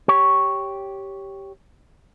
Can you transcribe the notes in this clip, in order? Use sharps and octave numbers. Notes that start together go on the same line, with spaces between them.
G4 C#5